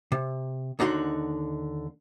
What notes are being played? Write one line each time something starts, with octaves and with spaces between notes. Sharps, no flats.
C3
D#2 D3 D#4 F#4 C6